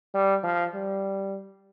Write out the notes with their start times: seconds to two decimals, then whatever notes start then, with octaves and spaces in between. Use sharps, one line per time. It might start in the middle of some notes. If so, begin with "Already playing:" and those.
0.14 G3
0.44 F3
0.74 G3